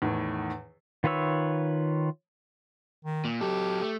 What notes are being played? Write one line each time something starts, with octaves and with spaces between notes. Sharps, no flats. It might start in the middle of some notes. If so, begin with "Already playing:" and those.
E2 A2 D#3
D#3 F4 B4 C#5 E6
D#3
A#2
F#3 G4 A4
A3